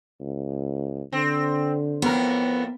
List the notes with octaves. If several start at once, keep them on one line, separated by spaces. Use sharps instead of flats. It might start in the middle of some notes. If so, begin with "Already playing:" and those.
C#2
D3 C4
F2 A2 B3 A#4